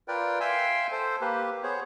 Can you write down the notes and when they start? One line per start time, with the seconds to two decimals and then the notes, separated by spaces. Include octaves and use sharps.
0.08 F4 A#4 B4 D5 G5
0.40 E5 F5 G5 G#5 C6 E6
0.92 A4 C5
1.21 A#3 G4 B4
1.63 B3 G#4 C5 C#5